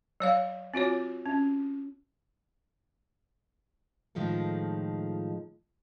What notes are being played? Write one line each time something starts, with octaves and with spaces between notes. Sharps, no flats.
F#3 C#5 F5
C4 F4 F#4 C#5
C#4
A2 D#3 F3 G#3 F4 A4